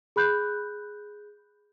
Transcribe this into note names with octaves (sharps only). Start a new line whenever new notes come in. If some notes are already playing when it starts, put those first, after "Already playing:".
G#4 B5 F#6 G6